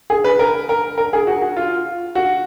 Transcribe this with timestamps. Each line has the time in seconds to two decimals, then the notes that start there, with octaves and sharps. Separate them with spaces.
0.10 G#4
0.24 B4
0.39 A#4
0.69 A#4
0.98 A#4
1.13 G#4
1.27 F#4
1.42 F#4
1.56 F4
2.15 F#4